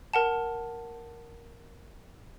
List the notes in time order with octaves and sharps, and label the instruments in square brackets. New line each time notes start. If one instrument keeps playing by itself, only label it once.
[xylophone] A#4 F#5 A5